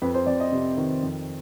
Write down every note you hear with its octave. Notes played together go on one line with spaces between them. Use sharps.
F2 B4
C5
F2 D5
D#5
C3
D#3
F2